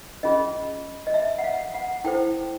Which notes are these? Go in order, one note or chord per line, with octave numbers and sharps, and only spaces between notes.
C#4 F4 G#4 D#5
D#5
E5
F#5
F5
F#5
E4 A4 C5 G5